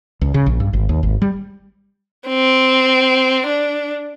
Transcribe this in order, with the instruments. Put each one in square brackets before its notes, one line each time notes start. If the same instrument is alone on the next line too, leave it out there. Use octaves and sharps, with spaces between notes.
[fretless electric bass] C#2
C#3
A#1
G2
G#1
D#2
G#1
G3
[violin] C4
D4